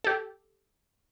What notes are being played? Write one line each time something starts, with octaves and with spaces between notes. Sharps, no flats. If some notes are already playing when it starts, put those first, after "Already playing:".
G4 A4